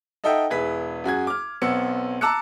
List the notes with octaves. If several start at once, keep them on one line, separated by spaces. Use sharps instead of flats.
D#4 A4 D#5 E5 F#5 G5
E1 E4 G#4 B4 B6
F#2 F#4 G#4 G#6
D6 F6
B1 B3 C4 E6 C#7
A5 A#5 D6 E6 F#6 C#7